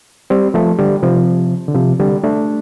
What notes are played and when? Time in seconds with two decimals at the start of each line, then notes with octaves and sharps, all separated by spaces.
0.30 G3 C4
0.54 F3 A3
0.79 D3 G3
1.03 C3 F3
1.68 D3
1.75 C3 F3
2.00 D3 G3
2.23 A3 D4